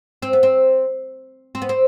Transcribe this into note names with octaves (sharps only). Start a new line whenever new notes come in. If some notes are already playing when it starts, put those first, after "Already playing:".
C4
B3
C4
C4
B3
C4